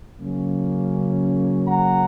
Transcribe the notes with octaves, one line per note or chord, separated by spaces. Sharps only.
C#3 F#3 A#3 C#4
F#5 A#5